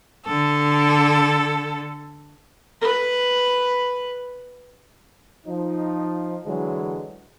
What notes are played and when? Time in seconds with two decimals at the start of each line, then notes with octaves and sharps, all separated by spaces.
0.24 D3 A4
2.82 B4 B5
5.47 F3 D#4
6.46 D3 E3 F#3 G#3